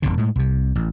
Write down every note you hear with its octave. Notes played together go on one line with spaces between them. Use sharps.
E1 A#1 B2 D3
A2 G#3
C2 C3
A1